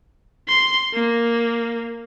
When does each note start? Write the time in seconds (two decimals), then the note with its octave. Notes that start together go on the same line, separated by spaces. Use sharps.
0.48 C6
0.94 A#3